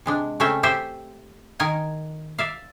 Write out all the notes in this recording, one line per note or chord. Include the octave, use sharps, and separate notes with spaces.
C3 G#3 D4
C#3 A3 C4 C#4 E5 G5
G4 A4 C5 E5 G5
D#3 A#4 D#5 G#5 A#5
D5 E5 F5